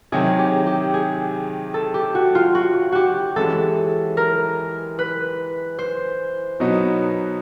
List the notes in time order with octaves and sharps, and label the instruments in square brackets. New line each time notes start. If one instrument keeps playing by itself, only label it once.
[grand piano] C3 D#3 F#3 [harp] G#4
[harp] G4
G4
G#4
A4
G4
F#4
F4
F#4
F#4 G4
[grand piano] E3 G#3 C#4 [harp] A4
[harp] A#4
B4
C5
[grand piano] B2 F#3 B3 D#4 F#4